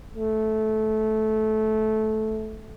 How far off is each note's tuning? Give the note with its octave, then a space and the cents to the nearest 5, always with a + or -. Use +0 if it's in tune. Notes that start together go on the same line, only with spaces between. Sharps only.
A3 -15